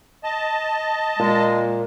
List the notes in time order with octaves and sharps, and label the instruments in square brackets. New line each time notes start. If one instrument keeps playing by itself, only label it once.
[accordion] D#5 A5
[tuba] A#2 [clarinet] G#3